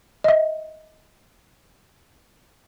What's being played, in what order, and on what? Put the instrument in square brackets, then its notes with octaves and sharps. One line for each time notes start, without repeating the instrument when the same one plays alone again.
[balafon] D#5 E5